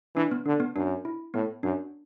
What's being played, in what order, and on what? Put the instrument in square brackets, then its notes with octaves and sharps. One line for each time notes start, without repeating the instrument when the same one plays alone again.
[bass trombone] E3 [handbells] D4
[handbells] B3
[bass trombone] D3 [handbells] D4
[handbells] B3
[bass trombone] F#2 [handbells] D4
[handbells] E4
[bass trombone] A2 [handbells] B3
[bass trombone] F#2 [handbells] D4